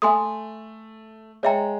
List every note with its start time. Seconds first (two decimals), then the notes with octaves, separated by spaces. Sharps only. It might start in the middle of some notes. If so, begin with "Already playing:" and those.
0.02 A3 E5 G#5 C6 D#6
1.43 G#3 C#5 E5 G5 A#5